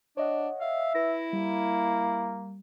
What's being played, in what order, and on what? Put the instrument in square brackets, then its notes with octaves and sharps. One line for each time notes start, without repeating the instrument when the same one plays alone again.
[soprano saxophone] D4 [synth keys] C#5 D#5 F#5
[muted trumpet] E5 [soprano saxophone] F5
[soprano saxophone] E4 [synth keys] B4 A#6
[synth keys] G3 [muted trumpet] A#3